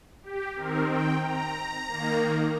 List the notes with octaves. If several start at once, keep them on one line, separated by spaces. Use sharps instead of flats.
G4
D#3 C4 A#4
G5
A#5
D#3 A#3